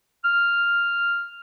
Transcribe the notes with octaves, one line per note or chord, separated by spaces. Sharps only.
F6